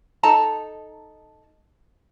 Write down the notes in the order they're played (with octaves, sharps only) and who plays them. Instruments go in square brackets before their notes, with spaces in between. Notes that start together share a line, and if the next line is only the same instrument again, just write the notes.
[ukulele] D#4 A4 A5 A#5